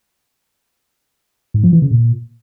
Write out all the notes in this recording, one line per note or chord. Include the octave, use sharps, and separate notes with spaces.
G#2
F3
E3
C#3
A#2